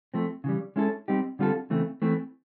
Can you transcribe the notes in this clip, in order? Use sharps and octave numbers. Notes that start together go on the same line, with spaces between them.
F3 A3 C4
C#3 E3 G3
G#3 C#4 E4 A4
G3 C4 D#4 G4
D3 G3 C4 F4 A4
C#3 E3 A3 C4
E3 A3 C4